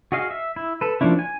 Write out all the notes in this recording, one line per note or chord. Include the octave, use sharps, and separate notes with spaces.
F#4 G#4 D#5 F5
E5
E4
A4 B4
F3 A#3 C#4 D4 E4
G#5